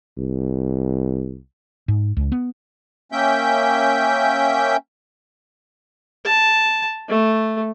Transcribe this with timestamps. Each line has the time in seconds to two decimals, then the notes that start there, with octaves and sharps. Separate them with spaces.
0.18 C2
1.88 G#2
2.17 C#2
2.32 B3
3.12 A#3 C#4 E5 G5 G6
6.25 A5
7.09 A3